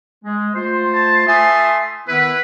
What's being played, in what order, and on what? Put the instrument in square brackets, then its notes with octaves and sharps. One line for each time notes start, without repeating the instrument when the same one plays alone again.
[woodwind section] G#3
A3 F4 C5
[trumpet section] A5
[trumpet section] A3 A5 C6 [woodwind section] E5 G#5 D#6
[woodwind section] D#3 B3 E4 [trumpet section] B4